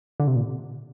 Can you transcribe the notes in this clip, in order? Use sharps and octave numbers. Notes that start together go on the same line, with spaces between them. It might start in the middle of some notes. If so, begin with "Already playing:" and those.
D3
C3
A#2